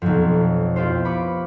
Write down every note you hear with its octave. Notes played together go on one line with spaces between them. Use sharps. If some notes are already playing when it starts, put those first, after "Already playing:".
B1 F2
E4 F4 G4 C5
B4 B5 C#6 D6